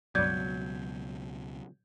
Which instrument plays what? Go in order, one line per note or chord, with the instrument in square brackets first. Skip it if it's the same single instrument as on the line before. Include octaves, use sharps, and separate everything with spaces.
[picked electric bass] C#2 B2 [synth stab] G2 D5 [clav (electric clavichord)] F#3 [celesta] G6 G#6